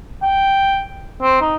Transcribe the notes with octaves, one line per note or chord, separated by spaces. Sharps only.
G5
C4
D#4